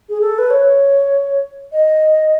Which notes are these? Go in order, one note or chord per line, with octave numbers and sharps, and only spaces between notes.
G#4
A4
B4
C#5
D#5